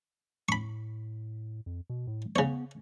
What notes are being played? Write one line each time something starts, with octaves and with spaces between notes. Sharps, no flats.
A2 B5 C#6
F2
B2
A2
C#3 B3 C#5